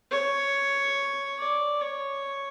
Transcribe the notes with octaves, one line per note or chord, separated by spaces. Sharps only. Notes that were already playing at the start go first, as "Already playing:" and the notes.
C#5
D5
C#5